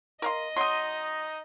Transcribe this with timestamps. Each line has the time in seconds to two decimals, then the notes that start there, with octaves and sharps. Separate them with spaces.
0.22 A#4 D#5 F5 C6
0.56 F#3 D#4 C6 D#6